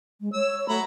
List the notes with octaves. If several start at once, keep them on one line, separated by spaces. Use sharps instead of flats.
G#3
C#5 E6
F#3 A3 A#5 B5